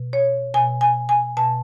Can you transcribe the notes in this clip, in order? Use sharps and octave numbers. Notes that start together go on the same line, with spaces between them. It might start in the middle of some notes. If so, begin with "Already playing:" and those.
Already playing: B2
C#5
B2 G#5
G#5
G#5
B2 A5